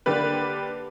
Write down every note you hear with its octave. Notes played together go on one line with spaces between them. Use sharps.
D3 A#3 D4 G4 B4